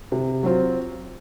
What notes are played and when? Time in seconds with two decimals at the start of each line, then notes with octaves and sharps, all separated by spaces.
0.12 C3
0.43 F#3 C4 F4